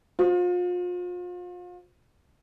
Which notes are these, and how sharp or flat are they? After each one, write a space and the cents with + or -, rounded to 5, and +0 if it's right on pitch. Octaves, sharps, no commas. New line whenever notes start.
F4 +35 C5 +0